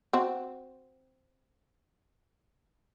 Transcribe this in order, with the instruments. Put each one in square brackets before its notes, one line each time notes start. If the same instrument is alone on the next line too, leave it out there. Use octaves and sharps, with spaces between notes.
[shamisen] C4 F#4